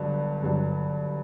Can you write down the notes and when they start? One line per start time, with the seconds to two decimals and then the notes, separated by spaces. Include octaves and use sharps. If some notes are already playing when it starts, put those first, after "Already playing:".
Already playing: G1 G2 F#3
0.43 G1 G2 F#3